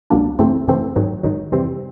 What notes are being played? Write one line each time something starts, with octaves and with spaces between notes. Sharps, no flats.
C#2 B2 F#3 A#3 D4
F#2 C#3 E3 A3 C4
F#2 C#3 E3 A3 C4
G#2 D#3 F#3
G#2 D#3 F#3
F2 C3 E3 G3 C4